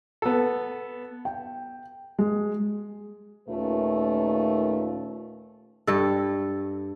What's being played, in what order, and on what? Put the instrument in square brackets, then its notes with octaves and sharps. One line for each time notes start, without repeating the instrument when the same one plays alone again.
[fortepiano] B3 A4
[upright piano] G5
G#3
[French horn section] D#2 A#2 A3 C#4 F4 B4
[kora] G2 A4